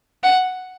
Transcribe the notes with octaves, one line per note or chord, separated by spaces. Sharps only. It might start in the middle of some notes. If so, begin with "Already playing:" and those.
F#5